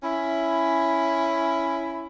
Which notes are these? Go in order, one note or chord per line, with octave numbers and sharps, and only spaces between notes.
C#4 E4